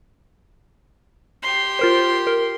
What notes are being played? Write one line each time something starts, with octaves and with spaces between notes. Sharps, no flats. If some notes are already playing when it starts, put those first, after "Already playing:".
G4 C6
F4 A#4 C5
A#4